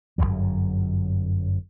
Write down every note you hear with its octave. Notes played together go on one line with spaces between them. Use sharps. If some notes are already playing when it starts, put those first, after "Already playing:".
G1 C2 F#2 F#3